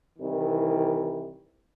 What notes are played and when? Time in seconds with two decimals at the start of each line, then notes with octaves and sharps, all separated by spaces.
0.19 C2 D#3 E3